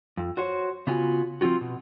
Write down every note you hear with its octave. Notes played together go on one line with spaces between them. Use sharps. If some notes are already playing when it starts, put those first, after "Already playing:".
F2
F#4 C5 C#5
C#3 B3 F4 F#4 G#5
F3 C4 C#4 F4 F#4
B2